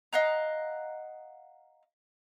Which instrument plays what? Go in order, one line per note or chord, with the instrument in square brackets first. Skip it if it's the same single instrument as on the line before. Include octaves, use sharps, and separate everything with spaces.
[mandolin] D#5 F5 F#5 A#5